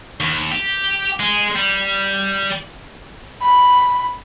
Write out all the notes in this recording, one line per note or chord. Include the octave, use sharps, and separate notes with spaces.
D#2
G4
G#3
G3
B5